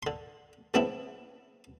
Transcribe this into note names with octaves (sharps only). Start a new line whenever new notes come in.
D3 C6
C#3 E3 B3 C4 D4 E4